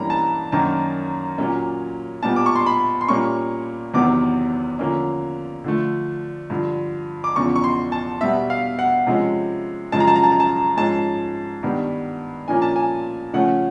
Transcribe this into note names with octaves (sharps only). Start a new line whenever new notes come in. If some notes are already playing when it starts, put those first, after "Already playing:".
Already playing: G2 E3 G3 A#3 C#4 A#5 B5
A5
F#2 D#3 F#3 A#3 A5
A#2 F#3 A#3 C#4
A#2 G3 B3 A5
D6
C#6
C6
B5
C6
A#2 G3 A#3 C#4 C#6
E2 C3 D#3 F#3 B3 D6
D3 F3 A#3 C#4
D3 F3 A3
G2 D3 F3
D6
E2 C#3 F3 C#6
C#6
C6
A5
B2 G3 B3 E5
F5
F#5
C3 F3 G#3 C#4
F#2 C#3 F3 G#3 A5
A#5
A5
A#5
A5
A#5
A5
G#2 F3 G#3 C#4 A5
G2 D#3 G3 B3
A#2 F3 A#3 C#4 G#5
A5
G#5
C#3 F3 A3 C#4 F#5